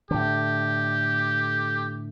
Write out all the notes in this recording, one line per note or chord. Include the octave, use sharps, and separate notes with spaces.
A2 D3 G4